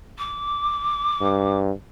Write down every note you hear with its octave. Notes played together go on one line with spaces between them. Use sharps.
D6
G2